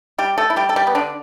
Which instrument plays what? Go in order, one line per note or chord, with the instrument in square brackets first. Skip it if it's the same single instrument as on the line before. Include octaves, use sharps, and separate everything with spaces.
[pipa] G3 G4
A3 A4
E4
G3 G4
A4
G3 G4
B3
D3 D4